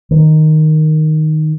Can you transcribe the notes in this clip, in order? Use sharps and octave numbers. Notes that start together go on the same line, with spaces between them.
D#3